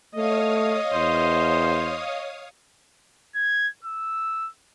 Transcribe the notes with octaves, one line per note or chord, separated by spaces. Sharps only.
A3 C#5 D#5 F5 D#6
E2 C5
G#6
E6